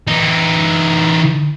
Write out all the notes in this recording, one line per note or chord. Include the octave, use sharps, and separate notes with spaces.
E3 D#4